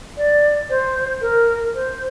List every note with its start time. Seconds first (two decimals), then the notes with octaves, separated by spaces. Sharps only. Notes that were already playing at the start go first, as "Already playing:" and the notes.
0.17 D5
0.70 C5
1.21 A#4
1.74 C5